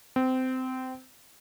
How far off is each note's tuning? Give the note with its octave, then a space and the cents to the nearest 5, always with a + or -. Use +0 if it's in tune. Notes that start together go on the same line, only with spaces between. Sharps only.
C4 -20